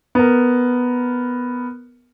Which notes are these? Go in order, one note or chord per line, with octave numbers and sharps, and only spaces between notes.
B3 A#4